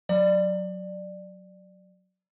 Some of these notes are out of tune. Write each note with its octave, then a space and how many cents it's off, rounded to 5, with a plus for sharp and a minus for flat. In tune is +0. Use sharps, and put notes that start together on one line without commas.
F#3 +0 D5 +20